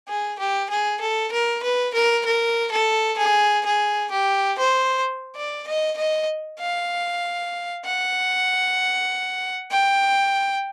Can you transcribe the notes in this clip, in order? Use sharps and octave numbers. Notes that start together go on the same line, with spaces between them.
G#4
G4
G#4
A4
A#4
B4
A#4
A#4
A4
G#4
G#4
G4
C5
D5
D#5
D#5
F5
F#5
G5